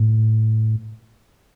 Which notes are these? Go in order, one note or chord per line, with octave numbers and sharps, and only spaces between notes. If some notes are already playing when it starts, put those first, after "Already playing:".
Already playing: A2